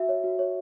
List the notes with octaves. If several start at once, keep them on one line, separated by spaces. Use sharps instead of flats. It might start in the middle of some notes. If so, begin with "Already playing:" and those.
Already playing: F#4 E5
C#5
F#4
C#5